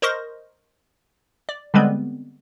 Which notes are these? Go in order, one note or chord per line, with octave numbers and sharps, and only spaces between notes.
A#4 C5 D#5 C6 C#6 A#6
D5
D3 G3 G#3 B3 C4